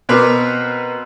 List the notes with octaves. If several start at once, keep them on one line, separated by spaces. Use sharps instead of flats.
B2 B3 C4 A#4 B4 D6